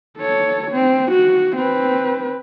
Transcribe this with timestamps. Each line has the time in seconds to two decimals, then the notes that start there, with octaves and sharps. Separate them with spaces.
0.18 A4 C#5
0.72 C4
1.12 F#4
1.56 C4 B4